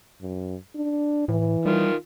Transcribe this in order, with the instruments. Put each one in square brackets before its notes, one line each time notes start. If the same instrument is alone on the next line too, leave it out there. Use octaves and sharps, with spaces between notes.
[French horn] F#2
D4
[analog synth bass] A2 [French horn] E3
[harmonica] D#3 F4 [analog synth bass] G3